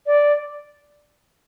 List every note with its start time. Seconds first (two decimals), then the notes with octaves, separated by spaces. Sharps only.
0.07 D5